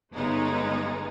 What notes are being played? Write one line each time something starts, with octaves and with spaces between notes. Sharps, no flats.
G1 C#3 G#3 A3 B3 D#4